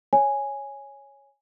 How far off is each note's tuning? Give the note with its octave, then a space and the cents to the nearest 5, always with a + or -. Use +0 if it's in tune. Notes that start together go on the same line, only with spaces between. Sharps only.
C#5 +0 G#5 +0